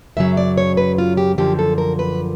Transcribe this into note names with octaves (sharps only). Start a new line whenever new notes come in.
F#2 C#3 F#3 E5
D5
C#5
B4
F4
G4
F#2 D3 F3 G4
A4
A#4
B4